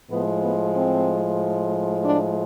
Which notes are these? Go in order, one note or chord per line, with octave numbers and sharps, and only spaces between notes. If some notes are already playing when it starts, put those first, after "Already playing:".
A2 F3 G#3 B3
B3
C4
D4